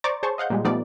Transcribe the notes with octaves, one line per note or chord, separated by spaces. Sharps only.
C5 D5 A#5 C#6 D6 A6
G#4 C5 C#5 A5 C#6
D#5 F5 F#5 G6
A#2 G3 G#3
F3 G3 A3 B3 D#4 D5